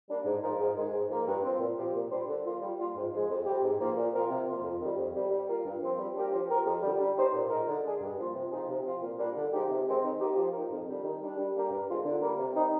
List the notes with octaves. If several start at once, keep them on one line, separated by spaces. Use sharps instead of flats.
G3 A#3 D4
G#2
F3 G#3 D#4 A#4
G#2
D#3 G#3
G#2
F3 A#3
G2
F3 C4
A#2
F3 C4 G4
A#2
G3 D4 G4 C5
D3
F3 A#3 F4
G3
A#3 F4
G#2
F3 G#3
F2
C3 G3 C4 G4
G#2
F3 A#3
A#2
F3 C4 F4 A#4
C3
F3 A#3 F4
F2
D#3 G3
F2
C3 D#3 G3
G3
A#3 F4 A#4
G2
F3 C4
G3
A#3 D4 G4 A#4
F3
C4 G4 A#4
F2
D3 G3
G3
C4 D#4 G4 C5
A#2
G#3 D#4 A#4
D3
G#3 D4 G#4
G2
F3 A#3 F4
C3
F3 C4 D#4 G#4
C3
F3 C4 F4
A#2
G3 A#3 D4
D3
F3 G#3 D#4 G4
C3
D#3 G#3 C4
D#3
A#3 D#4 G4
F3
A#3 D#4 A#4
F2
D3 G3 D4
D#3
G3 D4
G3
A#3 D4 G4 A#4
G2
D3 G#3 C4 F4
D3
G3 A#3
C3
G3 C4 D#4